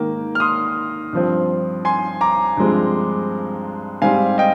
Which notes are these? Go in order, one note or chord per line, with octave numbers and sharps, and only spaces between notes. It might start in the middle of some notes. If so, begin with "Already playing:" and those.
Already playing: G#2 D#3 A#3
F6
C6 D#6
G2 F3 C4
G#5 C6
A#5 D6
G2 F3 G#3 C4
G#2 G3 C4 F5 G#5
D#5 G5